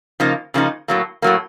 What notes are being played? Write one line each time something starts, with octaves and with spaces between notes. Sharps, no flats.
C#3 F3 A#3 D#4
C#3 F3 A#3 D#4
A2 F#3 A#3
A2 F#3 A#3